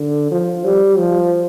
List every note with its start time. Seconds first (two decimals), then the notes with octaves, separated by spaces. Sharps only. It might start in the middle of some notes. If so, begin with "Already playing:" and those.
Already playing: D3
0.31 F3
0.64 G3
0.97 F3